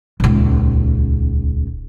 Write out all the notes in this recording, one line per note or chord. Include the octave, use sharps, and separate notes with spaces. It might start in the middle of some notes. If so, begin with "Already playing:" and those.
D#1 C#2